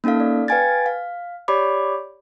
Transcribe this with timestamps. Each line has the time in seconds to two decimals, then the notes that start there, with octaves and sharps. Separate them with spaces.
0.04 A#3 C#4 D#4 A4 F5
0.20 D5
0.48 B4 F5 G5 G#5 G#6 A6
0.86 F5
1.48 G4 C#5 D5 B5 D6